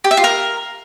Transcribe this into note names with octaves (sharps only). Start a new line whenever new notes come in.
G4
E5
F4
A#4